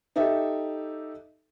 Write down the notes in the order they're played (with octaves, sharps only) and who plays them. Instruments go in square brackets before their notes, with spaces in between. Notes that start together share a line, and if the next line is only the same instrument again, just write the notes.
[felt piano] D#4 G4 A4 E5